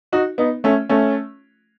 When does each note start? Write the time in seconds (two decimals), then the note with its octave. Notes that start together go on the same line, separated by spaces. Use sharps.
0.12 D#4 F#4
0.38 B3 D#4
0.64 A3 C#4
0.89 A3 C#4